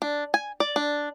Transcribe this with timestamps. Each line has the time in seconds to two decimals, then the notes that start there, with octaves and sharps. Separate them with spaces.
0.02 D4
0.34 G#5
0.60 D5
0.76 D4